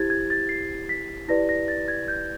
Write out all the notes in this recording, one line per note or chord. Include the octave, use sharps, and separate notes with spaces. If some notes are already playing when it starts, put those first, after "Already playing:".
Already playing: E4 G4 C5 G#6 A6
G#6
A6
C7
B6
E4 G4 B4 D5 A#6
A#6
A6
G#6
G6